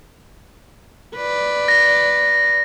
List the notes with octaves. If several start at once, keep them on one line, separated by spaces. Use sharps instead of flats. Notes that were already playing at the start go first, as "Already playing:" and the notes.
B4 D5
A#6